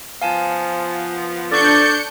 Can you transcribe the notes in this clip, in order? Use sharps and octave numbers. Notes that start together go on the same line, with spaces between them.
F3 B3 F5 G#5 A5
D4 A4 D5 C#6 G6 C#7